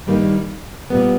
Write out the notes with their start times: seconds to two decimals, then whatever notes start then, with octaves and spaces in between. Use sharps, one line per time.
0.06 G2 D#3 G3 A#3 D#4
0.90 A#2 G3 B3